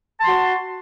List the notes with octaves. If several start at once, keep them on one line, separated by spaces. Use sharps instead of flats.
F#4 A5 C6